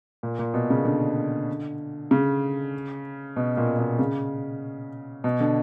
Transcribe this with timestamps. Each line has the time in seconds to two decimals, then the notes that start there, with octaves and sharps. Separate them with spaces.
0.23 A#2
0.39 A#2
0.54 B2
0.70 C#3
0.85 D3
2.11 C#3
3.36 B2
3.57 A#2
3.79 B2
3.99 C#3
5.24 B2
5.40 D3